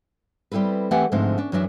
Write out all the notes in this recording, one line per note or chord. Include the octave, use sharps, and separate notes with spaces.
G3 C4 E4 A4 B4
E3 A3 C4 G4 F#5 G#5
G#2 D3 F3 A3 C4 D#4
C#4 D4
F#2 E3 F#3 C#4 D4 E5